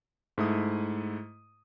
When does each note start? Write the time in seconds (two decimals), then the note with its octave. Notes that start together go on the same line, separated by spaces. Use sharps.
0.38 G#2 A3 E4 D#6